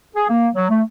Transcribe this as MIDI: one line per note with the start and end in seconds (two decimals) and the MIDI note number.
0.15 0.27 68
0.29 0.48 58
0.55 0.66 54
0.69 0.81 57